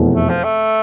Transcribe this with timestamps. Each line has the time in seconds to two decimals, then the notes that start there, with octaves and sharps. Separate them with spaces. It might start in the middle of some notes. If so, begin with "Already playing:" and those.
Already playing: F1 E2 B2
0.14 A3
0.29 F3
0.44 A3